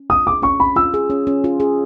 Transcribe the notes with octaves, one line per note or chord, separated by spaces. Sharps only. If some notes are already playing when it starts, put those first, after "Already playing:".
Already playing: C#4
F4 D#6
G#4 D6
C#4 C#6
C#4 B5
F4 E6
G#4
C#4
C#4
F4
G#4